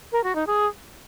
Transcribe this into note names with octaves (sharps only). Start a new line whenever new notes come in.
A#4
F#4
D#4
G#4